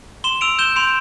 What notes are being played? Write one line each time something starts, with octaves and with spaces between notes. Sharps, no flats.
C6 E7 G7
E6 D7 F7
G6 E7 G7
C6 D7 F7